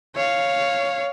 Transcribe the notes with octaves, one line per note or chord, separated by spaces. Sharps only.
C#5 F5